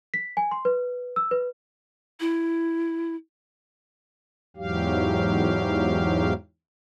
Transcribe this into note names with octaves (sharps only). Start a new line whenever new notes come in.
B6
G#5
C6
B4
E6
B4
E4
E2 G#2 F#3 G4 F5